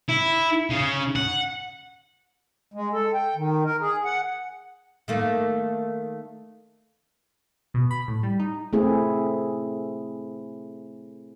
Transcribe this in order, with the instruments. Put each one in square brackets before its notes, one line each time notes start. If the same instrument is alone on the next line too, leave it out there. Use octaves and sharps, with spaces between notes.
[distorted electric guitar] E4
C#3
F#5
[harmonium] G#3
A4
G5
D#3
A#4
G#4
F#5
[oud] D#3 A3 A#3
[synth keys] B2
B5
A2
G3
D#4
[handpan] A3 C4 E4 G#4